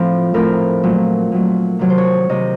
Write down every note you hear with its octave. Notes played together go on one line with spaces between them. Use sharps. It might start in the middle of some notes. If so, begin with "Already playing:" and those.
Already playing: A2 F3 A3 C4
A2 F3 C4 A#4
A#2 F#3 A3
A#2 F#3 A3
C3 D#3 F#3 C4 C#5
C5
C#5
C3 D#3 F#3 C4 D#5